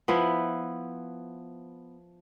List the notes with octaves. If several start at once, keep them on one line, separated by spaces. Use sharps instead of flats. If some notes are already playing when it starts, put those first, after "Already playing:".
F3 B3 E4 B4